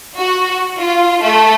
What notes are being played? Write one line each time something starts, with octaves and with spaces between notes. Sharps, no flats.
F#4
F4
A3